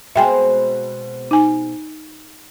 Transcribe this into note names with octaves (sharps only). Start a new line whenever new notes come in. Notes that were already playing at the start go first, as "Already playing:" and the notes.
B2 G#3 C4 E5 G5 G#5
D#4 G#5